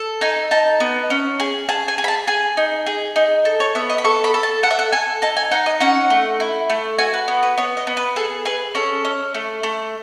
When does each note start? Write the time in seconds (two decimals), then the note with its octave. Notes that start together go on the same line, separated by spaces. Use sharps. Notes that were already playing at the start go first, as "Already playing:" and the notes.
Already playing: A4
0.21 D#4 G#5
0.51 D#4 A5
0.80 B3
1.10 C#4
1.40 G#4
1.69 G#4 A5
1.88 G#5
1.98 G#4
2.04 B5
2.08 A5
2.27 G#4 G#5
2.57 D#4
2.86 G#4
3.16 D#4
3.45 A4
3.60 C#5
3.75 B3 E5
3.90 D#5
3.98 B5
4.04 A4 C#6
4.24 B5
4.34 A4
4.43 A5
4.63 A4 F#5
4.71 E5
4.79 F#5
4.92 A4 G#5
5.22 D#4 A5
5.37 G#5
5.51 D#4 F#5
5.66 D#5
5.80 C#4 F#5
6.10 A3
6.40 E4
6.70 A3
6.99 F#4 G#5
7.14 B4
7.28 B3
7.43 B4
7.58 B3 C#5
7.77 D#5
7.87 B3
7.97 B4
8.16 G#4 A4
8.45 G#4 B4
8.75 C#4 A4
9.05 C#4
9.34 A3
9.63 A3